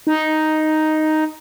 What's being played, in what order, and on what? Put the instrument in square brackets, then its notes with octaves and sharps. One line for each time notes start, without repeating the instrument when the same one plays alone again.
[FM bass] D#4